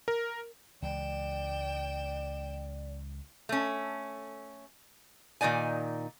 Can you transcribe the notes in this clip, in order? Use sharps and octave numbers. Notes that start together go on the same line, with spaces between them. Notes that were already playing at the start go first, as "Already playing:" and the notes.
A#4
C#2 E3 G#3 D5 G5 E7
A3 C#4
A#2 D#3 D#4 D5 G#5